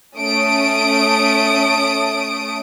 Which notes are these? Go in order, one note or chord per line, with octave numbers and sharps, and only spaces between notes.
A3 C#4 D#6 D7